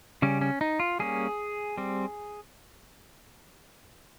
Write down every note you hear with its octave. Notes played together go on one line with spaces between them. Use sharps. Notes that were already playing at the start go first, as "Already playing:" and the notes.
C#3 G3 C#4
C#4
D#4
F4
G3 A#3 C#4 G#4
G3 C4